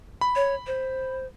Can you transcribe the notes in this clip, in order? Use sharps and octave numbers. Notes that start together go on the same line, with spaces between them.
B5
C#5
C5